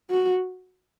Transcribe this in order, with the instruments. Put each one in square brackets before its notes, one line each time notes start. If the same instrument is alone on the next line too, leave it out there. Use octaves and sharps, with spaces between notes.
[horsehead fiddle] F#4